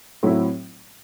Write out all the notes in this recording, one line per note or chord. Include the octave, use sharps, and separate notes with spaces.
A2 F#3 C4 E4